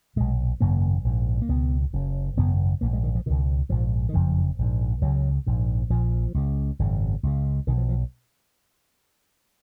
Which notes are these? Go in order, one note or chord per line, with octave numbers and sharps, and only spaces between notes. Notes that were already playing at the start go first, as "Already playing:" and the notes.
B1 A#2 G#3
G#1 F#2 C#3 A#3
A#1 G#2
A#3
C#2 B2 B3
F#1 F#2 C#3
G#1 F#2 C#3 B3
A#1 G#2 A#3
G#3
D#3
F3
C#2 B2 D#3
A#1 G#2 F3
D#3
F#1 F2 C#3 F3
A#1 G#2
C#2 F#3
C#3
A#1 G#2
A#1 A#2 F3
C#2 C#3
G#1 F#2 C#3
C#2 C#3
B1 B2 D#3
F3
F3